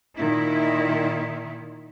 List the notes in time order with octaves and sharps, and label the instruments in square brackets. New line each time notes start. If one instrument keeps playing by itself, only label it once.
[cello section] A#2 D#3 E4